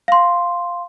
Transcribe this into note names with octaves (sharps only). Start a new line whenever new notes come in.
F5 C6